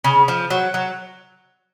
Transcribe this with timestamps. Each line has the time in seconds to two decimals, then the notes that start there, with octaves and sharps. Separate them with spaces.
0.04 C#3
0.28 F3
0.50 F#3
0.74 F#3